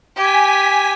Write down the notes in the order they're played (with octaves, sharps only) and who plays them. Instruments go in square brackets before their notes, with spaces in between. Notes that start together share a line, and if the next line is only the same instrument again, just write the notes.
[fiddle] G4 [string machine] G#5 B6